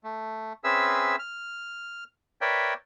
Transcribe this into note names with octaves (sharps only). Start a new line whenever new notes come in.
A3
C4 C#4 G#4 B4 E5 E6
F6
A#4 B4 C#5 D5 E5 G5